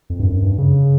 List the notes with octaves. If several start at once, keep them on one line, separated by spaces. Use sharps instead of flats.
F2
G2
F#2
G2
C#3